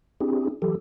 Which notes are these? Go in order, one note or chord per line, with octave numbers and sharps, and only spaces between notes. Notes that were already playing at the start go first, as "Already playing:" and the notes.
C4 D4 E4 G4 G#4
E3 F#3 G4 A4